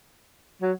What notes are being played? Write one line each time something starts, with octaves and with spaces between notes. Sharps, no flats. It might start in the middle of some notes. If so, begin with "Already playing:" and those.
F#3